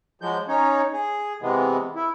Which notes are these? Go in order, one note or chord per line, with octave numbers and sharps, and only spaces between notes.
F3 F#3 G#3 G6
C#4 D#4 C#5
G#4
C3 E3 G#3 B3
E4